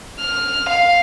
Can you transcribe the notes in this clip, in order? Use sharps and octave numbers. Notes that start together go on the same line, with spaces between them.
F6
F5